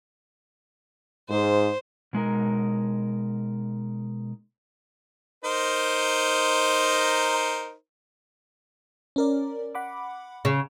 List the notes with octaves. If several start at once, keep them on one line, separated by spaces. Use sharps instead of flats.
G#2 C5
B2 G#3 D#4 A#4
D#4 A#4 C5
C#4 A#4 D5
F#5 B5 D6
C#3